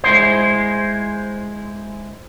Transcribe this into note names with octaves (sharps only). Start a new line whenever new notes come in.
G#3 E4 C5